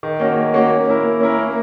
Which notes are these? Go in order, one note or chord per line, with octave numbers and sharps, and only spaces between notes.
D#3
A#3 C#4 F#4
D#3
A#3 C#4 F#4
A#3
C#4 E4 A#4
A#3
C#4 E4 A#4
A#3